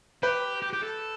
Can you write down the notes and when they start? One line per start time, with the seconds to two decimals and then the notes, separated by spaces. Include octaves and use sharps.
0.23 G4 B4
0.62 G4
0.73 G4
0.83 A4